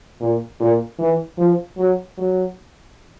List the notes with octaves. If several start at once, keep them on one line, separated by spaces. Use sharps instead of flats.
A#2
A#2
E3
F3
F#3
F#3